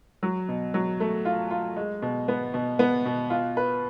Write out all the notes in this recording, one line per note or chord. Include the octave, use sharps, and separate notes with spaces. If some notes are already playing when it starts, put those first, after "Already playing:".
F#3
B2
F#3
A3
F4
F4
G#3
B2
B3
B2
B3
B2
F4
B4